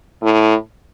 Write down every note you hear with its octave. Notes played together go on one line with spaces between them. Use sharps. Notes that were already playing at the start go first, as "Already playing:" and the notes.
A2